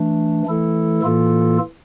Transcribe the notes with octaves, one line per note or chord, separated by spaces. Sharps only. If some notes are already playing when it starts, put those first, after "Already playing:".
Already playing: E3 A3 D4
E3 A3 E4 A4
A2 E3 A#3 F4 A4